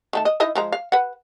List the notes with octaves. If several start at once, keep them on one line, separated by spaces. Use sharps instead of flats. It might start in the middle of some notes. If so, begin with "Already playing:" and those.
D#3 A3 A5
D#5
D#4 E4 D#5
F3 G#3 A#5
F5
B4 F#5